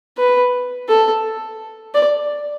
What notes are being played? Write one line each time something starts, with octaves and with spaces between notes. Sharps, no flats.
B4
A4
D5